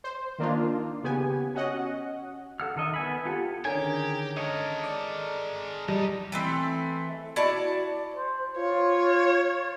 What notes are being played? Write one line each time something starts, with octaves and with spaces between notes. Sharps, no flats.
C5
D#3 A#3 D4 D#4 F4
C#3 B3 G4 G#5
C#4 F#4 D#5 F#5
A4 F#5 F6
D#3 A4 D#5 E5
B3 G#5 B5
F4 G4 A4 F#5
D3 D#3 C#4 G4 G#4 A#4 G#5
G#3 A4 A#4 C#5 D#5
D5
G3 D#4 G4 D#5 A5
E3 A3 C4
E4 F#4 D5 A5
C5
F4 C#5